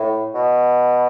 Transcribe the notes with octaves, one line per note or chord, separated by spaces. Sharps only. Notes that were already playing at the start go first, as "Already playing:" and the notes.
Already playing: A2
B2